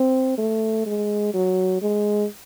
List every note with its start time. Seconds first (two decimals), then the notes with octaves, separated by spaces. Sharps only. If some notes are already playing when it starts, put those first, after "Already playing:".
Already playing: C4
0.37 A3
0.86 G#3
1.34 F#3
1.82 G#3